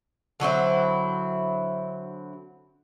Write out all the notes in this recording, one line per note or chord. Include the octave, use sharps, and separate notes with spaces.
D3 F#3 C4 E4